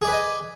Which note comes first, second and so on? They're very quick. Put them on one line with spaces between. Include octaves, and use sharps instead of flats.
G#4 D5 B4 G#5 D#5